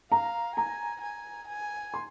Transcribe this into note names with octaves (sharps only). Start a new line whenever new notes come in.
F5 A#5
G#5 A#5
G#5
G#5
C6